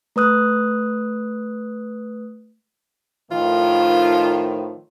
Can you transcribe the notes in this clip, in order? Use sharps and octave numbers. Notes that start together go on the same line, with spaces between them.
A3 B4 D#6 F#6
A2 D#3 F3 F4